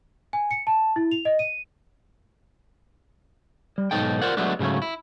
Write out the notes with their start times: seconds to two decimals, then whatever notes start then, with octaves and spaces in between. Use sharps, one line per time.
0.33 G#5
0.51 C#7
0.67 A5
0.96 E4
1.11 F7
1.25 D#5
1.39 D#7
3.78 G3
3.91 B1 G#2 D#4 A4 G5
4.22 F4 A#4 C5 D5 F#5
4.37 F#3 G#3 A3 B3 D4
4.59 G#2 C#3 F#3 A3 C#4
4.82 E4